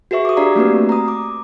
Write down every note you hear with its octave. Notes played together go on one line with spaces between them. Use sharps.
F#4 G#4 B4 E5 C#6
D6 D#6
D4 G4 D5 F5 A#5
A3 A#3 C4 F#4 B4
A#5 D#6
D6